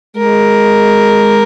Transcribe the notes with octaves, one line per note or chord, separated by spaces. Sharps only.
G#3 A#4